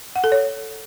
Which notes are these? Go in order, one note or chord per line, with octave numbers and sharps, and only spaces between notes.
F#5
A4
C#5